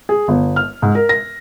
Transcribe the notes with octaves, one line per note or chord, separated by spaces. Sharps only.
G#4
G1
F6
G#2
A#4
A#6